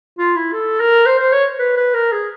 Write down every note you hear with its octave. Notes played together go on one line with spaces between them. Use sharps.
F4
E4
A4
A#4
C5
C5
C#5
B4
B4
A#4
G#4